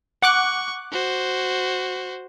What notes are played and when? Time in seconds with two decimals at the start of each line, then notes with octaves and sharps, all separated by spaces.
0.22 F#5 C#6 D6 F#6
0.91 F#4 C5